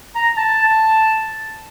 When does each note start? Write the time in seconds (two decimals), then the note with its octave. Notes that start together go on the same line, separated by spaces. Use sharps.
0.15 A#5
0.38 A5